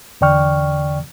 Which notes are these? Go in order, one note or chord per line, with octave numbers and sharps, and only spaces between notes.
E2 D3 D5 G5 C#6 F6